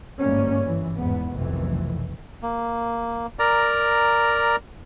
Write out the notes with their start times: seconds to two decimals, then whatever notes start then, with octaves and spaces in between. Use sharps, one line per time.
0.19 G1 G#2 G3 A#3 C#4
0.65 E3
0.96 E2 G#2 B3
1.34 F1 B1 D#3 E3
2.43 A#3
3.39 A#4 D5 A#5